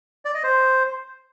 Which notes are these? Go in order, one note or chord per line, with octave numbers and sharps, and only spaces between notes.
D5
D#5
C5